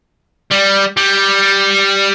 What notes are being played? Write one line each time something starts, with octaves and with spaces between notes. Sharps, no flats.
G3
G3